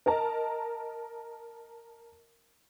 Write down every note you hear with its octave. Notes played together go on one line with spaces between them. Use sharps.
A#4 D#5 A5 A#5